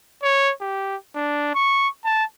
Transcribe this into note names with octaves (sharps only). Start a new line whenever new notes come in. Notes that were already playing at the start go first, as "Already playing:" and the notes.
C#5
G4
D4
C#6
A5